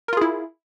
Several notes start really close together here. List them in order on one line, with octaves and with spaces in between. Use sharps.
A#4 F4 G#4 E4